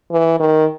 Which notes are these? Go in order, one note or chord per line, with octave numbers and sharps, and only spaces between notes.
E3
D#3